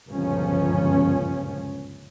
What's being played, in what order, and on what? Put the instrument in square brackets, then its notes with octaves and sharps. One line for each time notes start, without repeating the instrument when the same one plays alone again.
[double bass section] G1 C#2 F#2 A#2 F3 C#4